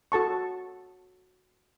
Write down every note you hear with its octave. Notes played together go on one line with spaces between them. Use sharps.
F#4 A4 A5 C#6